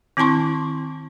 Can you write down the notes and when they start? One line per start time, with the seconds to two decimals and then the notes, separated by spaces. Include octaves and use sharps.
0.17 D#3 C4 E4 A5 C6 C#6